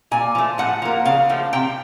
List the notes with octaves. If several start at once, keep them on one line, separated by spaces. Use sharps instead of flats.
A#2 G#5
F3 A3
A2 F#5
F3 A#3
C#3 F5
F3 A3
C3 G5